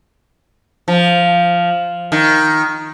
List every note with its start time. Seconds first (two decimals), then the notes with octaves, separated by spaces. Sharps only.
0.88 F3
2.12 D#3